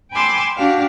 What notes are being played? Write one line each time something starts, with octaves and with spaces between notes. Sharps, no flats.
G5 G#5 B5 C6 D6 E6
D4 F#4 G4 F5